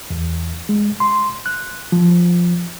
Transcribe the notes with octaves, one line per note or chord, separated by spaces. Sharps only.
E2
G#3
C6
F#6
F3